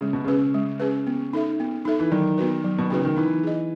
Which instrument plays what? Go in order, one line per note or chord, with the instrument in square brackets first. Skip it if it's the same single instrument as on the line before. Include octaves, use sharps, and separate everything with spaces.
[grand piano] C#3 [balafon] G#3
[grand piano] B2
[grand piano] C#3 [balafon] C#4 G#4 B4
[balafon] G#3
C#4 G#4 B4
B3
D#4 A4 E5
B3
D#4 A4 E5
[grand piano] E3
[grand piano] D#3 [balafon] F#3
[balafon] B3 D#4 F#4 B4
F#3
[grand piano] B2
[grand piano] C#3 [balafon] B3 D#4 F#4 B4
[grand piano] D#3
[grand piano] E3 [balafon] D#4
[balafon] G#4 D#5